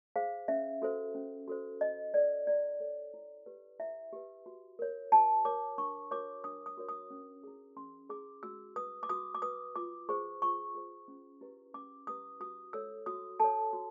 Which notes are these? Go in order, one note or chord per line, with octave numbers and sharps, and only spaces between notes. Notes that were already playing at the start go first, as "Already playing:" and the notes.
G#4 C5 F5
C#4 E5
F#4 A4 C5
C#4
F#4 A4 C5
E4 D#5
A4 C#5 D5
E4 D5
A4 C#5
E4
G4 B4
E4 E5
G4 B4
F#4
A#4 C#5
F#4 A5
A#4 C#5 D6
D4 C#6
F#4 A#4 C#5 D6
D4 D#6
D#6
F#4 A#4 C#5
D#6
C#4
E4 G#4
C#4 C6
E4 G#4 D6
F#4 E6
B4 D#6
D6
F#4 D#6
D6
B4 D#6
F4 D6
G#4 C5 C#6
F4 C#6
G#4 C5
C#4
E4 G4 B4
C#4 D6
E4 G4 B4 D#6
F#4 D#6
A4 C#5 E6
F#4 D#6
A4 C#5 A5
F#4